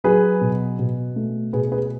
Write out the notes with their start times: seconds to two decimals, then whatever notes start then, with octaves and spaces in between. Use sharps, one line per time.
0.04 F#3 G#4 B4
0.41 B2
0.79 B2
1.16 A3
1.53 B2 G#4 B4
1.72 G#4 B4